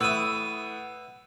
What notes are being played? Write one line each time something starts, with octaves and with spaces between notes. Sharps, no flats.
A2 B4 E5 F#5 D#6 E6 D#7